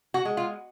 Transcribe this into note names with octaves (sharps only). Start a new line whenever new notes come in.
F#4
G#3
F4